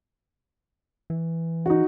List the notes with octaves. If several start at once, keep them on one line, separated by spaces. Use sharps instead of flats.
E3
D#4 F#4